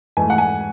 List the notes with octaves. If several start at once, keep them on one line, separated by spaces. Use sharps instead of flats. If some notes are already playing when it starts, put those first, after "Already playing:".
G#2 E3 A3 G#5
F#5
G#5